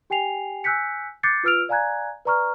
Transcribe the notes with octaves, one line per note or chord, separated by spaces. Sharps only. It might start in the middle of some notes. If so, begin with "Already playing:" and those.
G4 G5 G#5 C7 F7
G#5 E6 F#6 G6 B6 C#7
D6 F#6 G6 A6 C7 C#7
F4 B4 E6 F6 D7 F7
D5 F5 G#5 A#5 F#6 G#6
B4 D5 A#5 C#6 F6